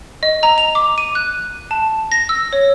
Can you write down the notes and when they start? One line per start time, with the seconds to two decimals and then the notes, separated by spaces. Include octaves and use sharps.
0.23 D#5
0.43 A#5
0.58 F7
0.75 D6
0.98 D#7
1.15 F#6
1.71 A5
2.12 A#6
2.29 E6
2.53 C#5